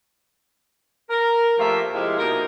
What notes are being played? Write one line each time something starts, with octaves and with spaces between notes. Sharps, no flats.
A#4
F3 A3 A#3 F4 G4 E5
F2 C3 G#3 E4 G4 F5
B2 A#3 D#4 A#4